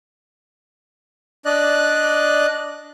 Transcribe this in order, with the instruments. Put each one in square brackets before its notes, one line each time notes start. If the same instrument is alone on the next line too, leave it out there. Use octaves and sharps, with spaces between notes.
[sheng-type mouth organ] D4 D5 D#5 F#6